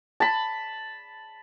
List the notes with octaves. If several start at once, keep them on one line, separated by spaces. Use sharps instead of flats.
A5 B5